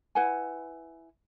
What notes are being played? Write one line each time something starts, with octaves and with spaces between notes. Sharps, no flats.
E4 B4 F#5 G#5